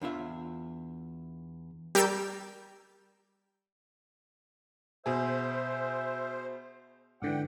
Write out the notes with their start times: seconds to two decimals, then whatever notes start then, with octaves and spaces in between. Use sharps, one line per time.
0.02 E2 D4 F4 E5
1.95 G3 A#4 D6 E6 G6
5.06 B2 G#4 C5 E5
7.22 G#2 D3 E3 D4 F#5 G5